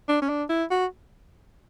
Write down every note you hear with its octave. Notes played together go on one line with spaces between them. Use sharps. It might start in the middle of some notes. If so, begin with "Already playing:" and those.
D4
C#4
D4
E4
F#4